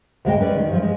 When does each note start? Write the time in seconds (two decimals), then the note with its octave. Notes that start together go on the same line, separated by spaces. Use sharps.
0.25 D2 G#2 G#3 C#5 D#5 G5
0.40 G#3 C#4 B4 D5
0.56 D#3
0.69 G2 F3
0.82 G#3